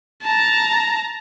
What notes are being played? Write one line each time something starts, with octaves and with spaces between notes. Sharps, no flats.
A5 A#5